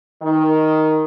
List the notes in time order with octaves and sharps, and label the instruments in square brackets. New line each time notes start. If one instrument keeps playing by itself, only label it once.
[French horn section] D#3